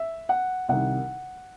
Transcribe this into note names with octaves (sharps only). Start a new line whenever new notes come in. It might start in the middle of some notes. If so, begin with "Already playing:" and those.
Already playing: E5
F#5
C2 C3 D#3 F#5